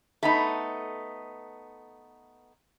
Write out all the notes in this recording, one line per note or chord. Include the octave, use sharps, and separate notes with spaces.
A3 B3 D#4